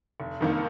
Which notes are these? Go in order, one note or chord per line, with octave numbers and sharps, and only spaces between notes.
F1
F2 D#3 A#3